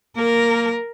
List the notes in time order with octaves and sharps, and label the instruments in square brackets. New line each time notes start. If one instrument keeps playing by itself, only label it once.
[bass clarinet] A#3 [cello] A#4